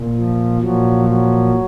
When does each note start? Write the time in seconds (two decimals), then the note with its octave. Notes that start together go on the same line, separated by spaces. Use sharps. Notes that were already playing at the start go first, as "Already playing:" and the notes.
Already playing: A#2
0.16 F3
0.61 A#2 F3 F#3
1.06 F#3